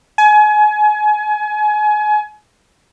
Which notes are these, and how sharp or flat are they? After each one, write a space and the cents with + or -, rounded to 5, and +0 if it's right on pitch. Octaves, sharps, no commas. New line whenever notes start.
G#5 +30